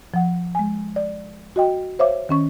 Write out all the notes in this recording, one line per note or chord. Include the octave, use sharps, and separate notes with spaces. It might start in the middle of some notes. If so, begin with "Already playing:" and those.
F3 F#5
G#3 G#5
D5
F#4 D#5 G5
C5 C#5 E5 F5 D6
D#3 C#4 C#6